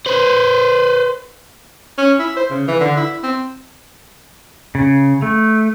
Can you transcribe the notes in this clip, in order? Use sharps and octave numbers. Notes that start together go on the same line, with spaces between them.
B4 C5
C#4
E4
C5
C#3
E3
D3
E4
C4
C#3
A3